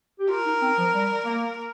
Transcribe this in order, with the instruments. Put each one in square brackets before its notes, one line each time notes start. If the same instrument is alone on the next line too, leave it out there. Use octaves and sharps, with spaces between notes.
[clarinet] G4
[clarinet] F4 [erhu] A#4
[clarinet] D#4
C4
F3
G3
A#3